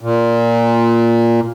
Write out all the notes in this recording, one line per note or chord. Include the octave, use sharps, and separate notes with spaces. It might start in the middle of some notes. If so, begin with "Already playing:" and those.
A#2